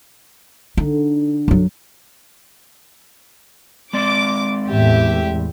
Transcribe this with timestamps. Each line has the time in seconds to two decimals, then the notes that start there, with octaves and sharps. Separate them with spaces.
0.77 D3 D#4
1.48 F#2 F#3
3.93 G#3 C4 D5 D6
4.69 E2 A2 G4 E5